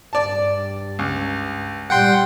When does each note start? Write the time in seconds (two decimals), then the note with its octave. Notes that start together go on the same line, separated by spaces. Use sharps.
0.13 G2 D5 A5
0.99 C#2
1.90 A#2 G3 F#5 G5 C6